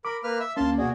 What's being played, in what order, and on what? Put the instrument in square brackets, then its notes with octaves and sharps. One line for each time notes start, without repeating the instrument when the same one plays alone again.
[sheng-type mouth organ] A#4 B5 [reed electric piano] D6
[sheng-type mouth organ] A#3 B4 F6
E5 E6
[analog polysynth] D2 A#3 [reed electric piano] C#4 [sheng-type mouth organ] F5 A5 C6
[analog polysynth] B2 A#3 [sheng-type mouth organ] F#4 G#4 [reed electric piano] D5